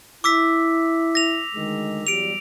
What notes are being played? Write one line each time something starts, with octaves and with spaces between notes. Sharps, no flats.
E4 D6 E6 B6
A#6 F7
D2 D#3 G#3
E2 F#3 G3 D7 F7